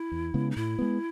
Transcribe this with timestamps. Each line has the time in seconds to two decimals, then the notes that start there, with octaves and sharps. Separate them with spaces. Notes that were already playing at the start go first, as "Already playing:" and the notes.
Already playing: E4
0.12 E2
0.34 C#3 G#3 B3
0.51 D#4
0.56 A2 E4
0.79 G#3 B3